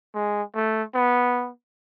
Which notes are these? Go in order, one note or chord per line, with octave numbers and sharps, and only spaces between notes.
G#3
A3
B3